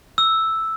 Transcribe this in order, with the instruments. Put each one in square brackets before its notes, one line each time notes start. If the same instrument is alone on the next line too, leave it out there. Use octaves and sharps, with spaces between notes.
[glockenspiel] E6